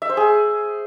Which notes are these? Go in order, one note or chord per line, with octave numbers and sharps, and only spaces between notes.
E5
C5
G#4